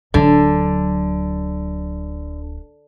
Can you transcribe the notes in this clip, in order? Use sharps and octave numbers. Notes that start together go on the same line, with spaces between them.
D1 D3 F#3